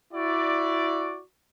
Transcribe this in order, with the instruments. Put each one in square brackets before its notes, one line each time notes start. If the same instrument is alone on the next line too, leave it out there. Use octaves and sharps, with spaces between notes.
[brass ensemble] E4 F#4 D5